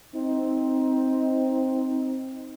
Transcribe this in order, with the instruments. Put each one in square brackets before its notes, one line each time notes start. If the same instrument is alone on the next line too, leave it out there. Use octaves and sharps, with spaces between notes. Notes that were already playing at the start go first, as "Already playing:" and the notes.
[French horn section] C4 D#4